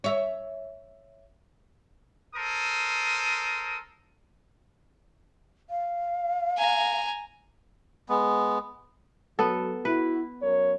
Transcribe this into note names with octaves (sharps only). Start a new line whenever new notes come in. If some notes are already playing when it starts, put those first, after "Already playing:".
C#5 E5
A4 A#4 C5 D#6
F5
G#5 A#5
G#3 B3
F#3 B3 F#4 A4
E4 F#4 B4
F#2 A#4 C#5